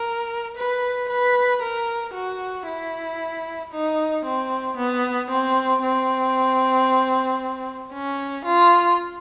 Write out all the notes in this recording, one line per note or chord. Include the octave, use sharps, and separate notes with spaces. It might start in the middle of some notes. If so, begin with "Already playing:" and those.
Already playing: A#4
B4
B4
A#4
F#4
E4
D#4
C4
B3
C4
C4
C#4
F4